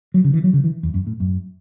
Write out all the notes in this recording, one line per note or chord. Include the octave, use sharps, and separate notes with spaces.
F#3
C#3
E3
F#3
C#3
E3
E2
F#2
A2
F#2